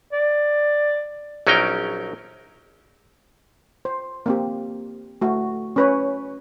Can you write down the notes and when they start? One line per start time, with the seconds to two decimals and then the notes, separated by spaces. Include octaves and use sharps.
0.13 D5
1.47 A#1 F#3 C#4 D#4 A#4 G5
3.85 C5
4.26 A#3 C4 G4
5.21 A3 F#4
5.76 C#4 B4 C#5